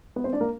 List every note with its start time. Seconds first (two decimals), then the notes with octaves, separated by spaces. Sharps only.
0.16 B3 B4
0.24 C4 C5
0.33 D4 D5
0.41 A#3 A#4